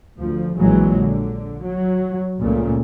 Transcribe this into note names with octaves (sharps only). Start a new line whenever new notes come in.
D2 F3
A#1 E3 F#3 G#3
D3
F#3
C#2 A#2 C#3 A3